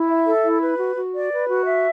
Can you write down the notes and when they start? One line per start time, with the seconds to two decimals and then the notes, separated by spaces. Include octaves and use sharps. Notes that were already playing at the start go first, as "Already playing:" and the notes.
Already playing: E4
0.09 E5
0.26 A4
0.45 E4
0.62 B4
0.79 F#4
0.96 F#4
1.14 D5
1.32 B4
1.48 F#4
1.66 E5